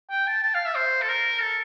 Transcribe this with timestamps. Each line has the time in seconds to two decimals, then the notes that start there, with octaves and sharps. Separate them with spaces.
0.10 G5
0.27 A5
0.43 A5
0.54 F5
0.65 E5
0.75 C5
1.02 A4
1.09 A#4
1.41 A4